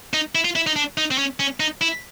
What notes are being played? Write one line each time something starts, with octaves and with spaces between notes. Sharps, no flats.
D#4
E4
F4
E4
D#4
D4
D#4
C4
C#4
C#4
D#4
E4